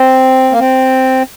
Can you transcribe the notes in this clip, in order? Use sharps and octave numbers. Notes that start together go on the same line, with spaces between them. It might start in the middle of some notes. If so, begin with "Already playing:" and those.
Already playing: C4
A#3
C4